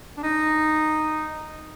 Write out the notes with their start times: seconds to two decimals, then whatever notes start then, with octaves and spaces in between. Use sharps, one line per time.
0.17 D4
0.23 D#4